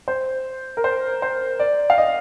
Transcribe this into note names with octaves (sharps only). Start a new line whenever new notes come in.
C5
A#4
C5
C5
D5
F5
D#5